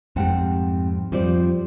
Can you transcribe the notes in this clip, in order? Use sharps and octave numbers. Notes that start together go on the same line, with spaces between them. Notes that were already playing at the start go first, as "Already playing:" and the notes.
F2 G#2 G3 C4 F#5 A5
F2 F3 G3 C5 D5